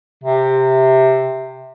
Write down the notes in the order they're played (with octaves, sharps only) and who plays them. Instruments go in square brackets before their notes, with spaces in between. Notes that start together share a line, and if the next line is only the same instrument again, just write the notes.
[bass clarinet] C3